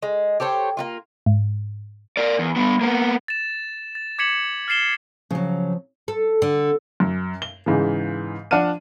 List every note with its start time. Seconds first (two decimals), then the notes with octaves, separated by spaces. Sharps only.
0.02 G#3
0.40 G4 A4 C5 C#5
0.77 A#3 B3 F4
1.26 G#2
2.17 A#4 D5
2.39 E2
2.56 G3 B3
2.81 A#3 B3
3.28 A6 E7
3.95 A6
4.19 D6 G#6 B6 C#7 E7 F#7
4.68 F6 A6 C7 E7 G7
5.31 C#3 F3 F#3
6.08 A4
6.42 D3
7.00 F#2
7.42 G7
7.66 G#2 C#3 E3
8.51 F3 D4 F#5 A5 F6 D#7